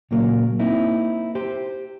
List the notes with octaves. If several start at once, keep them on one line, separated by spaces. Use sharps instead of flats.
A#2 C#3 F#3 A#3
A#3 C4 D#4 E4
G4 C5